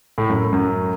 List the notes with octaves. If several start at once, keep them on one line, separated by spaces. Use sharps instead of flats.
A2
F#2
F#2